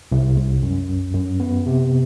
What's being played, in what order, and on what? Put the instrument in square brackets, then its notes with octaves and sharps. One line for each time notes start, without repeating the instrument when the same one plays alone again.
[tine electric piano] C2
C2
F#2
F#2
F#2
B3
C3